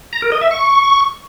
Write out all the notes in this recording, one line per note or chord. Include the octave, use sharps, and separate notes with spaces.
A#5
A#4
D#5
E5
C#6